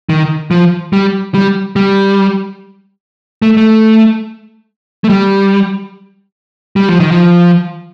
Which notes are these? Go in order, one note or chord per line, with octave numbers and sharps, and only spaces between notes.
D#3
F3
G3
G3
G3
A3
A3
A3
G3
G3
F3
D#3
F3